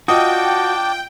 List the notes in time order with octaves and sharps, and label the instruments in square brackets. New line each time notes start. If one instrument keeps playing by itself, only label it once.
[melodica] D4 D5 A5 [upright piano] F4 D#5 D#6 [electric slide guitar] F#4 [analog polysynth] G5